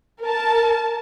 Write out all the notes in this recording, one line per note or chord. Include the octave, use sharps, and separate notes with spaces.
A#4 A5